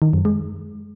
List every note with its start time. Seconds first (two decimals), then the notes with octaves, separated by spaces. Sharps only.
0.02 D#3
0.13 F#2
0.25 G#3